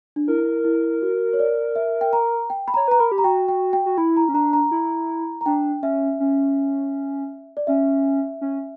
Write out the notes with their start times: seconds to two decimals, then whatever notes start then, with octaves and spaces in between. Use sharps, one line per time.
0.16 D4
0.28 E4 A#4
0.65 E4
1.02 F#4
1.33 C#5
1.39 D5
1.76 E5
2.01 G5
2.13 A#5
2.50 G5
2.68 B5
2.74 C#5 A#5
2.88 B4 A#5
2.99 A#4 B5
3.12 G4
3.18 A#5
3.24 F#4 G5
3.48 G5
3.73 G5
3.86 F#4
3.98 E4 B5
4.17 A#5
4.29 C#4
4.34 D4 A#5
4.53 A#5
4.71 E4
5.41 A#5
5.46 D4 G5
5.82 C#4 E5
6.20 C#4
7.57 D5
7.67 C#4 E5
8.41 C#4